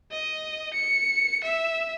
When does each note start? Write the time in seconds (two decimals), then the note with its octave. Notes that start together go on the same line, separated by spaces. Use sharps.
0.11 D#5
0.74 C#7
1.44 E5